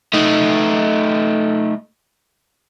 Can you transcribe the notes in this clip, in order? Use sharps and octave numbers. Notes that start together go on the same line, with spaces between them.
A3 D#4